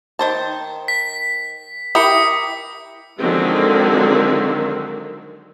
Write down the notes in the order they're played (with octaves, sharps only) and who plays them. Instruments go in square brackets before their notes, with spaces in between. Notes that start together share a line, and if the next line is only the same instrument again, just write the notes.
[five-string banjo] D#3 C5 A5
[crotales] B6
[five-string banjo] E4 G4 A#4 [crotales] D#6 C#7
[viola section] D3 D#3 F3 F#3 G#3 C4